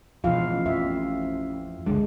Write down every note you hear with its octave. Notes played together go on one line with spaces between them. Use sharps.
B2 E3 F3 F4 F5
A1
F2 E5
G1 C#2 D3 G#3